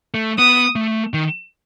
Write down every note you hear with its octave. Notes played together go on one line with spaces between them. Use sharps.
A3
B3 D#6
A3
D#3